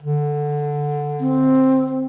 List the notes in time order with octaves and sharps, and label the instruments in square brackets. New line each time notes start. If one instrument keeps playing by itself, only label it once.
[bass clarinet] D3
[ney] C4